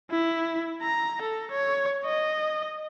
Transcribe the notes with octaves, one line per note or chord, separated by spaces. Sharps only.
E4
A#5
A4
C#5
D#5